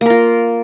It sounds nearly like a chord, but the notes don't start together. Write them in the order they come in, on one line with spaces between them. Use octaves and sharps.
A#3 A#4 F4